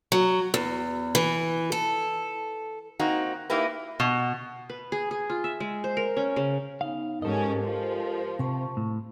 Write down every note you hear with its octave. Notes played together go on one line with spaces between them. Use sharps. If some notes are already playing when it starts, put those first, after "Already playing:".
F#3
E2
E3
A4
A#3 C4 D#4 F#4
A#3 D#4 E4 G4 B4
B2
B4
G#4
G#4
F4
E5
G#3
C5
A#4
C#4
C#3
B3 D#4 F5
G#2 C#4 G4 A4 A#4 D#5
F3
C3 A5 C#6
A2